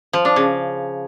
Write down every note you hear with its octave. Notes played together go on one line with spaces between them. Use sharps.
F3
D4
C#3